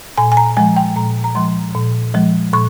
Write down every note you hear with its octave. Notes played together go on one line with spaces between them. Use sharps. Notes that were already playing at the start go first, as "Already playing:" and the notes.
A#2 G#5
G#5
A#5
F3 G#3 G#5
G5
A#2 A#5
A#5
F3 G#3 C6
A#2
F3 G#3
A#2 C#6